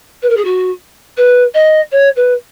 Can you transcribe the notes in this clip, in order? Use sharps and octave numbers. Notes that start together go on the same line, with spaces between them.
B4
A#4
G#4
F#4
B4
D#5
C#5
B4